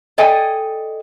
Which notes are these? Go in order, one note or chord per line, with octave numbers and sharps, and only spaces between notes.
A4 D5 D#5 G5 G#5